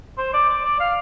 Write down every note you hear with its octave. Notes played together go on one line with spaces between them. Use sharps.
C5
D5
D5
D5
F5